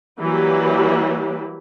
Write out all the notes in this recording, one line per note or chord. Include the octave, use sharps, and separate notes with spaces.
E3 F#3 G3 A#3 G4 B4